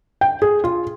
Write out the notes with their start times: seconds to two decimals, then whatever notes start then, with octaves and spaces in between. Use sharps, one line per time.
0.21 G5
0.42 G#4
0.64 F4